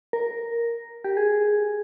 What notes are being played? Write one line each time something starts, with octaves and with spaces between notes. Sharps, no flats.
A#4
G4
G#4